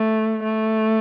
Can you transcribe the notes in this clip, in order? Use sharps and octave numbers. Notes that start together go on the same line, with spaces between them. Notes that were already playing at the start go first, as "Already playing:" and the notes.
Already playing: A3
A3